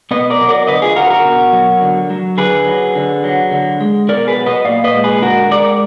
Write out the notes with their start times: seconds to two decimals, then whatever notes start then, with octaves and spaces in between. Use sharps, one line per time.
0.11 B2 B4 D#5
0.30 A#4 D5
0.40 F#3
0.49 A#4 D5
0.67 D3 B4 D#5
0.82 F4 G#4
0.96 D3 F#4 A#4
1.06 B4
1.10 F#4 A#4
1.25 B2
1.53 F#3
1.81 D3
2.10 F#3
2.38 D3 G#4 B4
2.66 F#3
2.95 D3
3.24 F#3
3.52 D3
3.81 G#3
4.08 B2 A#4 D5
4.27 G#4 B4
4.36 F#3
4.46 B4 D#5
4.65 A#2 D5 F5
4.84 B4 D#5
4.94 G#3
5.04 G#4 B4
5.22 D3 F#4 A#4
5.51 G#3 A#4 D5